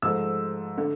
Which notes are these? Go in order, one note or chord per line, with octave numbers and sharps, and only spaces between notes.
G#2 F3 A3 E6
D3 A3